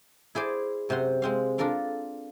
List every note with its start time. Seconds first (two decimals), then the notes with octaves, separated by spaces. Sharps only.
0.35 E4 G#4 C5 D5
0.89 F#2 C3 C4 F#5 C6
1.22 G#3 C4 F5
1.58 D4 F4 A4 A#4 F5